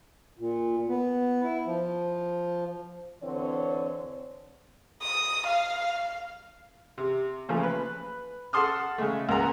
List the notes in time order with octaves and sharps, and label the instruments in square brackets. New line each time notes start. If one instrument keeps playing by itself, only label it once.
[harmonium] A#2
B3
E4
F3
[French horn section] D3 E3 C4 C#5
[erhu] D#6
F5
[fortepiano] C3
A#2 C#3 F3 A3
B4
A4 F#5 A5 C6 D#6 F6
C#3 G#3 A3
C#2 A#2 A#4 F#5 A#5